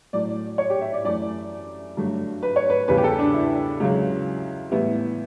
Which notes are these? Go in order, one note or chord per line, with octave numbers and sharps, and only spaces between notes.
A2 F#3 A3 D5
C#5
G4
E5
D5
F#2 E3 A3 D5
G2 D3 F#3 A3
B4
C#5
B4
E2 C#3 G3 B4
G4
A4
D4
E4
C#2 C#3 F#3
A2 E3 G3 B3 E4